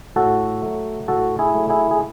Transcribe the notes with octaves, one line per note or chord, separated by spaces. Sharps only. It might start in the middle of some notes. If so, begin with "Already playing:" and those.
A2 F#4 A4
F#3 A3
A2 F#4 A4
E4 G#4
F#3 A3
E4 G#4
G#4